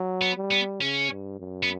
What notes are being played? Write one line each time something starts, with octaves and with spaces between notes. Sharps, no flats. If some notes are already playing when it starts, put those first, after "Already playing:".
Already playing: F#3
B3
G3
B3
C#3 C#4
G2
F#2
B3